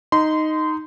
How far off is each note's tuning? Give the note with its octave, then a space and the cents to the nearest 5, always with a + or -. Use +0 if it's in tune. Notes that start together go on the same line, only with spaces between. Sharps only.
D#4 +0 C6 -25